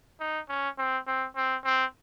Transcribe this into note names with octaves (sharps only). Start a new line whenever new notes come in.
D#4
C#4
C4
C4
C4
C4